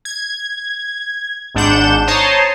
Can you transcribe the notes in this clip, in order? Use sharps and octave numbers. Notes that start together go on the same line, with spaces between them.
G#6
G#1 G#2 D4 F#5 G6 E7
C5 C#5 A5 A#5 C6 D#6